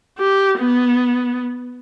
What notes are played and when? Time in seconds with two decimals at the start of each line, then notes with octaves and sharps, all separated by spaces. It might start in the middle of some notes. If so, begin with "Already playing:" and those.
0.19 G4
0.59 B3